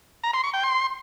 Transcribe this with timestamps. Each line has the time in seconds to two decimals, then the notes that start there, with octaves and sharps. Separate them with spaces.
0.24 A#5
0.34 C6
0.44 C#6
0.54 G5
0.64 C6